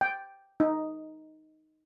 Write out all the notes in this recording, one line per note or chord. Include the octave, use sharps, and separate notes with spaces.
G5
D#4